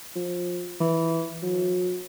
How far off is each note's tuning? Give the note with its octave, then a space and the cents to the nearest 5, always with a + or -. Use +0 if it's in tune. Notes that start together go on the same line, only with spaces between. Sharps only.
F3 +20
E3 -5
F#3 -40